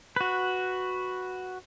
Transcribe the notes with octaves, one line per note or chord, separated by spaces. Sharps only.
F#4 B4